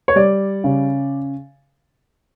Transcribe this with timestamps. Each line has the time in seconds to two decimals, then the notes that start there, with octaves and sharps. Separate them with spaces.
0.08 C#5
0.16 G3 D5
0.64 C#3